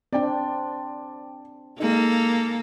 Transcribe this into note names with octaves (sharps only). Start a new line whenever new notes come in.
C4 D4 D5 G5
G#3 A#3 D#4 A4